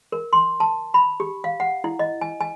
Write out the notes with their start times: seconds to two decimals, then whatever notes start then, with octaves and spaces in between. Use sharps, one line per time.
0.12 A#4
0.33 C6
0.60 A5
0.94 B5
1.20 G4
1.44 F5
1.60 F#5
1.84 E4
1.99 D#5
2.21 G#5
2.41 G#5